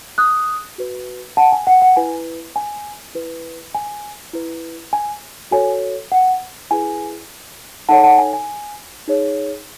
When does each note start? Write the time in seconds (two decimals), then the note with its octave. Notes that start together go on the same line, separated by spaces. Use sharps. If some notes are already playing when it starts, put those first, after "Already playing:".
0.18 D#6 F#6
0.78 F#4 B4
1.37 F#5 A5
1.52 G#5
1.67 F#5
1.82 F#5
1.96 E4 B4 G#5
2.56 G#5
3.15 E4 B4
3.75 G#5
4.33 E4 B4
4.93 G#5
5.51 F#4 A4 C#5 G#5
6.12 F#5
6.71 E4 G#4 B4 G#5
7.89 D#4 A4 C#5 F#5 A5
8.04 F#5 A5
8.18 G#5
8.33 G#5
9.08 D#4 G#4 C#5